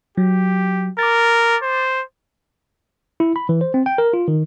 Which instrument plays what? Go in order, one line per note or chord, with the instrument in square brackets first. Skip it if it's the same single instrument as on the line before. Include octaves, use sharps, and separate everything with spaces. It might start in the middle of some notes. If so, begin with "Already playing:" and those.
[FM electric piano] F#3 [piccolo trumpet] G4
[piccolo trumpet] A#4 [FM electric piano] D6 A6
[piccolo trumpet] C5
[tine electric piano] E4
B5
E3
C5
C4
G5
A#4
F4
D#3